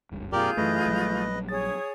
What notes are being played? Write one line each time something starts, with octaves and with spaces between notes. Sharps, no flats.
F#1 C#2 G2
F#2 B2 F4 G4 G#4 A#4 D5 G6
F#2 E3 A3 B4 D#5
A#1 F#3 G3
G#4 C#5 D#6 A6